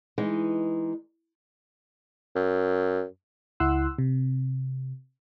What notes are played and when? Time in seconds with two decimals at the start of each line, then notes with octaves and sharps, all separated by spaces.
0.18 E3 G#3 D#4
2.35 F#2
3.60 C#2 E4 F#5 C6 E6 F#6
3.99 C3